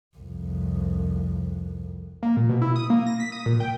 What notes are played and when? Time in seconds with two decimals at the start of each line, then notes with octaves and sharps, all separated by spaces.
0.17 C2 F2
2.23 A#3
2.37 A#2
2.49 B2
2.62 E4
2.76 D#6
2.90 A#3
3.07 A#6
3.20 B6
3.32 D#6
3.46 A#2
3.60 G5